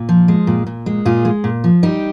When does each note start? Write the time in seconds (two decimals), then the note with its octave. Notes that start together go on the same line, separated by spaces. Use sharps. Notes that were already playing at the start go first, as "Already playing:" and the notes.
Already playing: A#2
0.09 F3
0.28 G#3
0.47 A#2
0.67 A#2
0.86 G#3
1.05 A#2 F4 G#4
1.25 G#3
1.44 A#2
1.64 F3
1.83 G3 D#4 G4